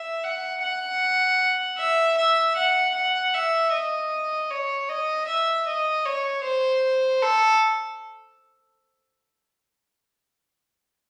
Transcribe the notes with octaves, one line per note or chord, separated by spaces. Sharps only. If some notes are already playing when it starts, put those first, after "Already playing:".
Already playing: E5
F#5
F#5
E5
E5
F#5
F#5
E5
D#5
C#5
D#5
E5
D#5
C#5
C5
A4